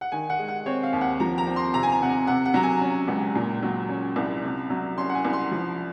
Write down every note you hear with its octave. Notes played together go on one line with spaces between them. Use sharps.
F#5
D#3 G#5
F#5
G#3
F#5
C4 C#5
F5
D#2
F#5
F3 A#5
A#5
C4
C6
C3 A#5
G#5
A#5
C3 F#5
G#5
C3 F#5
F#5
F#3 A#5
G#5
C#4
C#2
A#2
F#3
C#4
C2
C3
F#3
C#4 C6
F#5
G#5
C2
C6
F3